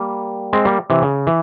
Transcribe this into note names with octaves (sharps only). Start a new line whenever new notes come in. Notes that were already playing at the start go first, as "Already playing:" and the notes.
Already playing: G3 A#3
G#3 C4
G3 A#3
C3 E3
C#3
E3